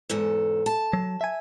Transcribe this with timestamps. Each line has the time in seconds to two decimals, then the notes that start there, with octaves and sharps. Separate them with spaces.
0.09 E2 G#2 A4
0.66 A5
0.93 F#3
1.21 E5 G#5